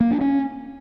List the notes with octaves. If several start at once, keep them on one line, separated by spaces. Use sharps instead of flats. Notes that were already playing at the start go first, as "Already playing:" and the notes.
A#3
D4
C#4